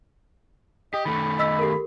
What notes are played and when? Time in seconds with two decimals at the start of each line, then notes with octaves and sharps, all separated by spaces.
0.94 G4 D#5
1.06 D#3 A3 B5
1.39 D#5 E6 B6
1.59 G4 A4 A#4